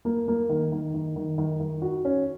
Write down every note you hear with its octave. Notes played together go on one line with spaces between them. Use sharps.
A#3
A#3
D#3
D#3
D#3
D#3
D#3
D#3
F#4
C#4